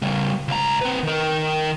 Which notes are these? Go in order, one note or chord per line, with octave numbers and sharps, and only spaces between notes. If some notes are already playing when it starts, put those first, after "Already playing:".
C#3 G3
C#2 A#5
C4 B4
D#3 A#4